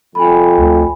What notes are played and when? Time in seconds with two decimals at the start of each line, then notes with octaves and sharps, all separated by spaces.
0.15 F2 G#5 B5
0.58 D2